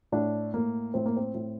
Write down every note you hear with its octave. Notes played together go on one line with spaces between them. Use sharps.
A2 D4
A2 A#3
A2 C4
A#3
C4
A2